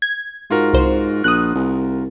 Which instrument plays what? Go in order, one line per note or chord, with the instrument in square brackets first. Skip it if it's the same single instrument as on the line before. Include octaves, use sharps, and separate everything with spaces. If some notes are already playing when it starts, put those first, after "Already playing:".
[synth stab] G#6
[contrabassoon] G#2 [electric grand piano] F4 F#4 A#4
[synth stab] C2 C5
[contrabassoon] A#1 [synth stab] D#6 F#6
[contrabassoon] C2